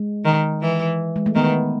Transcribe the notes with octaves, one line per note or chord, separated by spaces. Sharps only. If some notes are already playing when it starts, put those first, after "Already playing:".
Already playing: G#3
D#3
E3
G#3
A3
D#3 B3